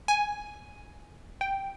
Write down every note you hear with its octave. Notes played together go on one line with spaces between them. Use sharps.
G#5
G5